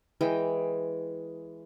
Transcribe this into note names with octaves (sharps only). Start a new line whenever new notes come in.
E3 G#3 G5